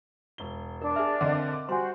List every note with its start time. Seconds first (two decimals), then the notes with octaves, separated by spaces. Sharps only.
0.38 E1 G7
0.82 D4 A#4
0.96 G#4 E5 F6
1.21 D3 C4 A#4 D#5 F#5
1.53 D6
1.69 G3 F#4 C5 G#5 C6